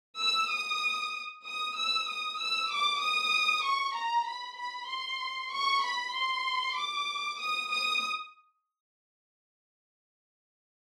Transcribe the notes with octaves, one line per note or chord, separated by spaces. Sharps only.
E6
D#6
D#6
E6
D#6
E6
D6
D#6
C#6
A#5
B5
B5
C6
C#6
B5
C6
D6
D#6
D#6